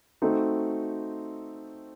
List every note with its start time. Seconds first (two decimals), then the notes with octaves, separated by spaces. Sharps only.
0.22 A3 C4 D#4 F#4